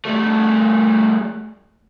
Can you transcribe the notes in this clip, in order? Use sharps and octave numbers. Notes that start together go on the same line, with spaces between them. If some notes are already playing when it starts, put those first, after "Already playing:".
G3 A3